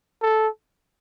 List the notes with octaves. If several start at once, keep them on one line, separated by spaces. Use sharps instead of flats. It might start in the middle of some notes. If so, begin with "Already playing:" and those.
A4